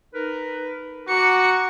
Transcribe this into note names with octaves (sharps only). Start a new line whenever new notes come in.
D#4 A#4 B4
F#4 A#5 D6 C#7